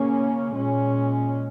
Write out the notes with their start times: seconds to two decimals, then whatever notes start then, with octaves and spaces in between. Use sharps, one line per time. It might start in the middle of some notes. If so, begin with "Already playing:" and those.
Already playing: C#3 A#3 C#4
0.54 A#2 G#3 C#4